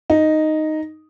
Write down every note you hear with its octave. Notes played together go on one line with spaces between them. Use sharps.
D#4